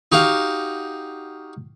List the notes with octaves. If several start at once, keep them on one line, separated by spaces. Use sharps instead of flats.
D#4 F#4 G4 F5